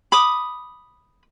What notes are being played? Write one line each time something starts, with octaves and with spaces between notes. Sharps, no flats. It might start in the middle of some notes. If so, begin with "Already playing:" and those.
B5 D6 D#6